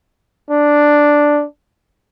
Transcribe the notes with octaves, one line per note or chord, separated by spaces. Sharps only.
D4